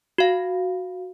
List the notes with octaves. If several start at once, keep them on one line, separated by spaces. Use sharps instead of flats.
F#4 F5